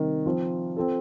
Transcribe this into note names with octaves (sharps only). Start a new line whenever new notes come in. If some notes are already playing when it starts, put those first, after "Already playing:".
Already playing: C3 D#3 G3
F3 C4 F4
C4 F4 A4